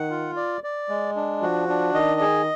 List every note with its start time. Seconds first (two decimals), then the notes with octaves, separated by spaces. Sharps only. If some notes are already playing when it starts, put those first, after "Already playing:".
Already playing: D#3 F#5
0.10 F4
0.36 D5
0.64 D5
0.89 G#3
1.16 D4
1.42 F3 F#4
1.69 D4
1.94 D#3 D#5
2.21 G#4